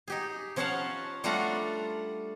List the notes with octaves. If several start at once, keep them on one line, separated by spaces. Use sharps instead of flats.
D#4 G4 G#4
F3 C#4 C#5 F5 F#5 A5
G3 A3 D4 F4 F#5 A#5